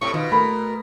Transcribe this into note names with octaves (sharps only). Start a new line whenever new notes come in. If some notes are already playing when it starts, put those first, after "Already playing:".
A2 C3 C#6
B2 D#3 F4
A3 A#4 B5